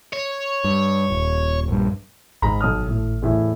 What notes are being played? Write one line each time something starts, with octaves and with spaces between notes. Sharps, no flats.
C#5
G2
D#1
A#1 G2
G#1 G#2 A#5 B5
B1 D#6 F6
A2
E2 A2 E4